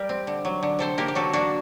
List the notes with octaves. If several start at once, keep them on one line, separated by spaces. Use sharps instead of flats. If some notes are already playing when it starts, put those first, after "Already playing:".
Already playing: G3 G4 A#4
C4
D3
F#3
D3
C3 A4 C5
A#3 G4 A#4
G4
F#3 F#4 A4
A#3 D4 F#4